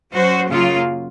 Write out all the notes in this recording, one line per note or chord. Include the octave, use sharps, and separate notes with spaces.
F#3 C#4 F#4 C5
F#2 C#3 F#3 A#3 F4